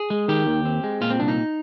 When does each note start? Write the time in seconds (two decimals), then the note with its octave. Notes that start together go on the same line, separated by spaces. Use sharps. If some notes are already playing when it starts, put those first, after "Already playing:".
Already playing: G#4
0.10 G#3
0.28 D#3 G4
0.47 D#2
0.65 C4
0.84 G#3
1.01 A#2 F4
1.10 C4
1.19 C2 D4
1.28 D#4